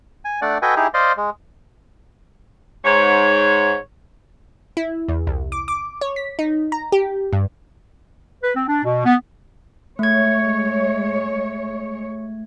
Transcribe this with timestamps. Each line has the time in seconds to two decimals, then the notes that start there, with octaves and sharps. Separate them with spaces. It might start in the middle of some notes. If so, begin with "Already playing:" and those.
0.25 G#5
0.42 A3 D4 D5 F#5
0.62 F#4 A4 B4 D#5 G5 G#5
0.76 D#4 E4 G4 G#4
0.94 C5 D5 D#5 F5 C6
1.17 G#3
2.85 G#2 C#5
4.77 E4
5.09 E2
5.27 C2
5.52 D6
5.68 D6
6.01 C#5
6.16 B6
6.39 D#4
6.72 A#5
6.92 G4
7.33 G2
8.43 B4
8.55 C4
8.68 D4
8.84 B2
9.05 B3
9.99 G#3 A3 C#5 G#6